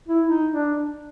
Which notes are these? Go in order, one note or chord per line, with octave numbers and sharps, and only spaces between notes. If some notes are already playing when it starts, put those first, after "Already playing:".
E4
D#4
D4